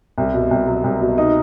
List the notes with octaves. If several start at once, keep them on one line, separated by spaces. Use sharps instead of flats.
C2
B2
C2
F#3
C2
B2
D#4